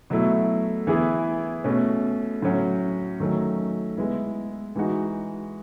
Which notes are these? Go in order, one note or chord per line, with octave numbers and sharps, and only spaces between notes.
B2 F#3 A3 E4
E3 B3 E4 G#4
B2 A3 C#4
A2 F#3 C#4 F#4
D#3 F#3 A3 C#4
G#3 B3 E4
E3 G#3 D#4 F#4